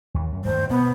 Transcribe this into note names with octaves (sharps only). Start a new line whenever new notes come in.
D#2
F#2
G2 D#3 A3 C5
B2 B3